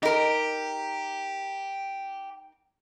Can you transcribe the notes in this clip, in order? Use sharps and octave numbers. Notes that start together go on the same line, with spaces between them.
D#4 G4 A#4